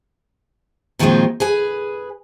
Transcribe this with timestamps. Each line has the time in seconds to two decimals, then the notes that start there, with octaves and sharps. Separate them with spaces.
0.99 A#2 D#3 F3 F#3 G#3 C4
1.40 G#4 B4 G#5